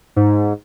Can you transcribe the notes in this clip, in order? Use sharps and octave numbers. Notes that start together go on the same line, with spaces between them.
G#2